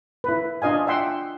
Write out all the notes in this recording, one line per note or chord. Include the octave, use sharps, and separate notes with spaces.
E4 B4
D4 F4 D#5 F5 G#5
E5 F#5 G5 C6